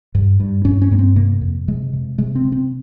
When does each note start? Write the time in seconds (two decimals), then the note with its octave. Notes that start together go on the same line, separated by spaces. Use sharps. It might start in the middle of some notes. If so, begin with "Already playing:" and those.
0.15 G2
0.40 G2
0.65 G2 C#4
0.82 C#4
0.91 G2 A#3
0.99 C4
1.16 C3 A#3
1.41 F2
1.68 C3 G#3
1.93 C3
2.18 C3 G#3
2.35 C4
2.45 C3
2.52 C4